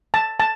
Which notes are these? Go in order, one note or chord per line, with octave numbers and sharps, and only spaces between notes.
A5
A5